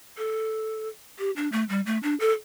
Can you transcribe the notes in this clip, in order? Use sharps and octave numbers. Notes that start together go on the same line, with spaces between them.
A4
G4
D4
A3
G3
A3
D4
A4